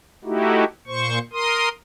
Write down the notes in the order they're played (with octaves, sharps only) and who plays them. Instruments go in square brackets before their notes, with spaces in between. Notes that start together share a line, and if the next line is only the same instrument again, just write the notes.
[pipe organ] A3 D#4 E4 F#4 G4
A#2 C5 C#6
A#4 C6 D#6